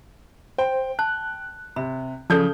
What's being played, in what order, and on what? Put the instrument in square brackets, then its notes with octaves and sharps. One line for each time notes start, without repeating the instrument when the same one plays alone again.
[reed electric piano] C5 [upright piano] G5
[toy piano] A5 [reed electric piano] F#6
[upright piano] C3 [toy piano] B5
[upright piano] C#3 G6 [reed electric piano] F3 [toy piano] A4 D5 A5